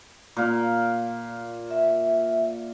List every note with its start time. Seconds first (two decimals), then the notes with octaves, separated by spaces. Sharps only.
0.37 A#2 F5
1.71 E5